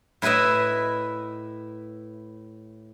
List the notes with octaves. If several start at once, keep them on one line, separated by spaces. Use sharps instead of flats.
A2 E4 B4 D#5 E5